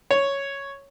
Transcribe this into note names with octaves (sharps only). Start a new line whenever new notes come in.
C#5